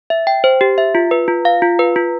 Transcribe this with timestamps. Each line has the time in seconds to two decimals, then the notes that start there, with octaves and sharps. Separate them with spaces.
0.10 E5
0.27 G5
0.44 C5
0.61 G4
0.78 E5
0.95 F4
1.11 B4
1.28 F4
1.45 F5
1.62 F4
1.79 B4
1.96 F4